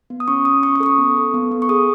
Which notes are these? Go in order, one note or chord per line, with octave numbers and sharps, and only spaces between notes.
B3
D#6
C#4 C#6
C#4 D#6
C#4 C#6
C#6
A4 D#6
C#6
B3
A4
B3
B3
C#6
G#4 D#6